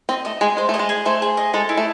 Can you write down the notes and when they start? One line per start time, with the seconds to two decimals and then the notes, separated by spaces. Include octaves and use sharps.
0.09 C4 D#5
0.25 A3 D#5
0.41 G#3 G#4
0.57 G#3 C5
0.69 A3
0.74 D#5
0.79 G#3
0.89 G#4
1.05 A3 C5
1.22 G#4
1.37 D#5
1.53 G#3 A4
1.69 E4
1.77 A3